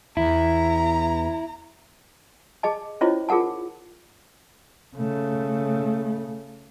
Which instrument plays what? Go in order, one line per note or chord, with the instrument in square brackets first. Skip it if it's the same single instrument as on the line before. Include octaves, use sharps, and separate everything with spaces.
[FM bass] E2 [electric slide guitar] E4 [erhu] A#5
[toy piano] G#4 D#5 A5
C#4 E4 F4 C5 C#5 D#5
F4 G#4 A#4 F#5 A5
[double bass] C#3 A3